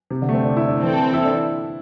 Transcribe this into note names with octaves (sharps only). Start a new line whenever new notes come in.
C3
D3
A3
C4
D4
E4
D4
E3 C4 A4
E4
D4